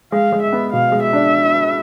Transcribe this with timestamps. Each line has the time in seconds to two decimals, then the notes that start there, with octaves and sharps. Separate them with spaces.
0.12 G#3 F5
0.32 G#3
0.42 E5
0.53 B3
0.73 B2 F5
0.92 G#3
1.03 E5
1.13 D4